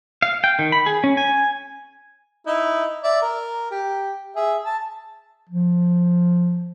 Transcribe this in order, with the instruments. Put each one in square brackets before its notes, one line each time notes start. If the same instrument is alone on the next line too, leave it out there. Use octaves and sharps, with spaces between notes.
[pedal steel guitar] F5
G5
D#3
B5
G#4
C#4
G#5
[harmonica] D#4 E4
D5 E5
A#4
G4
G#4 E5
A5
[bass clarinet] F3